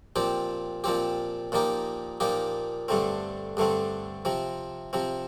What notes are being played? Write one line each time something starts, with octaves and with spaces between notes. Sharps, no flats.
A#2 F3 C4 G4
A#2 F3 C4 G4
A#2 F3 A#3 D#4 G4
A#2 F3 A#3 D#4 G4
G2 D3 A3 C4
G2 D3 A3 C4
C3 F3 C4
C3 F3 C4